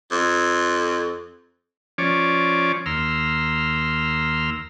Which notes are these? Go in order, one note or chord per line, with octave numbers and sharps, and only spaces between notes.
F2
F3 C#4 C#5 D5 D6
D#2 A#5 C6 E6 F6